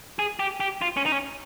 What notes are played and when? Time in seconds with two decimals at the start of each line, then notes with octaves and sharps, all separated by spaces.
0.19 G#4
0.39 G4
0.60 G4
0.82 F4
0.97 C#4
1.06 D#4
1.12 C#4